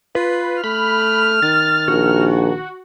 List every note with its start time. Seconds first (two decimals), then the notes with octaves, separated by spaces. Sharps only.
0.15 F4 B4
0.64 A3 B5 F6
1.42 D#3 A6
1.88 A#1 F#4